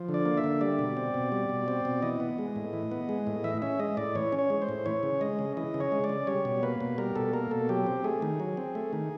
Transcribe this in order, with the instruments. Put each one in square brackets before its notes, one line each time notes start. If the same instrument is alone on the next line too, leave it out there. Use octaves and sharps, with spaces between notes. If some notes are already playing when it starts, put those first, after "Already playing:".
Already playing: [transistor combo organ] F3
D3
D5
A#3
E5
D3
G3 D5
B2
C4
B2
G3
B2
C4
B2
E3 D#5
B3
G#3
A2
E3
B3
G#3
A2
E3 E5
C#4 E5
G#3 D#5
A2 D5
E3 C#5
C#4
C#5
G#3
C5
A2
E3 C#5
C#3
G#3 D#5
C#3
E3 D#5
C#3
C#5
G#3
D5
C#3
G3 C#5
B2
A#3 B4
B2
G3 A#4
B2 A4
A#3 A#4
B2 A4
F#3 G4
C4
A3 G#4
D#3
F#3
C4
A3
D#3